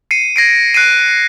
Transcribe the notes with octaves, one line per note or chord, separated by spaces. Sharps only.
C7 C#7 D#7
G#6 A#6 C7 D7
F#6 C7 D7 D#7